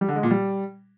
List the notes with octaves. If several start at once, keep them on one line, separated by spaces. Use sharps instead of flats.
G3
D3
G#3
A#2
G3